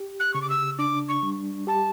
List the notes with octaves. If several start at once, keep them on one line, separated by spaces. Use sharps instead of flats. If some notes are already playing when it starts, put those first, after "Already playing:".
Already playing: G4
F#6
C#3 C#6
D6
E6
D4 D6
C#6
G3
G4 A5